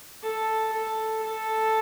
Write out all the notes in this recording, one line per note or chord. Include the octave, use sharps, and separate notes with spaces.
A4
A4
A4